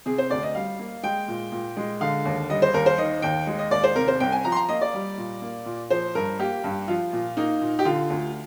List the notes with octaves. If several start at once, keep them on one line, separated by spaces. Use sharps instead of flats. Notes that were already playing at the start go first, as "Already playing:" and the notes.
C3 G#4
C5
D2 D5
D#5
G3 F5
A#3
G#3 G5
A#2
A#2
G#3
D3 F5
D#2
G3 D#5
C5
D#2 A#4
C5
D#3 D#5
D#2 G5
G#3
D#5
D#2 D5
C5
C3 A#4
C5
C2 G5
G#5
F3 A#5
C6
A#5
A#3 D#5
D5
G3
A#2
A#3
A#2
F3 C5
G2 A#4
A#3 G4
G2
F3 F4
A#2
A#3 D#4
A#2
G4
D3 F4
D2